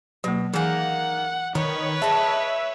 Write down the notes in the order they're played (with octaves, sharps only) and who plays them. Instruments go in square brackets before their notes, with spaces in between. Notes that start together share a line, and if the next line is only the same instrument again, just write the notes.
[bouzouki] B2 [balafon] F#3 A#3
[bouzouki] D#3 A#3 [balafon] E3 G#4 G#5 [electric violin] F#5
[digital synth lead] D#3 [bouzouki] C#4 [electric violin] B4 C#5
[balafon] G#4 [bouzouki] D#5 A5 [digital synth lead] E5